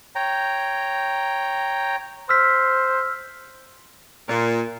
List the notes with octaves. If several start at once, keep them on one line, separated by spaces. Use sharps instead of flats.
C#5 G5 A#5
C5 E6 F6 B6
A#2